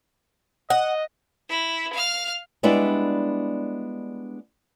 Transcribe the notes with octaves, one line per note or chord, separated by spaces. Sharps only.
D#5 F#5
E4
F5 F6
G3 G#3 B3 D4 E4 D5